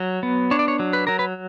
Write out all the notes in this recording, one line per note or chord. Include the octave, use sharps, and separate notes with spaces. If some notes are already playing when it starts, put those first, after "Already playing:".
Already playing: F#3
B3
D4 C#5
D5
C#5
F#3
B4
F#3 A#4
B4